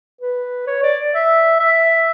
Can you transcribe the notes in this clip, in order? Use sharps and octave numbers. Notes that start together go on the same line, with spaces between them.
B4
C#5
D5
E5
E5